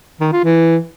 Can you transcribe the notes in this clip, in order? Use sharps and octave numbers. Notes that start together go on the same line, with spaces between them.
D#3
F4
E3